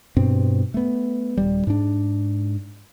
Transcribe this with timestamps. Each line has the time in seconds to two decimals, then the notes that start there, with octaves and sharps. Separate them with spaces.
0.17 G2 B2 C4
0.74 A3 B3
1.37 D#1 G3
1.67 G#2 D4